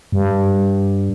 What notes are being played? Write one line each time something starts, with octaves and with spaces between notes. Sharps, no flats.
G2